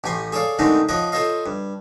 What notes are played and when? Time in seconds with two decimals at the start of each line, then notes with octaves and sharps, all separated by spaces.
0.04 A1 A2 G4 G#5 C6
0.32 G#4 A4 C#5 D5 F5
0.59 D3 D#3 G#3 A3 C4 D#4
0.89 F3 C#5 D#5 F#5 D6
1.12 F4 A4 C5 C#5 D#5 F5
1.46 G2